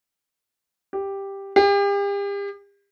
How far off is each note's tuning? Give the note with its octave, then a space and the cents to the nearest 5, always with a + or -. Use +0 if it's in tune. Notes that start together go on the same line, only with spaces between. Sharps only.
G4 +5
G4 +40